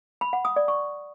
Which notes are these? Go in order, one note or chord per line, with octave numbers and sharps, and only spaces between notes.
B5
F#5
D#6
D5
C#6